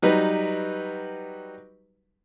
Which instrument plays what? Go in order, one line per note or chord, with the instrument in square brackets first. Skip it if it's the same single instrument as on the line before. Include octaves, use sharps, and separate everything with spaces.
[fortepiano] F#3 G3 D#4 B4